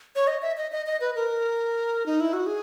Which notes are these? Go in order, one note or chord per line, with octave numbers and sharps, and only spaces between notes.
C#5
D#5
E5
D#5
D#5
D#5
B4
A#4
D#4
E4
F#4
G#4